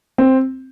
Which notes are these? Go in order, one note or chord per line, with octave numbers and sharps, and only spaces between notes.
C4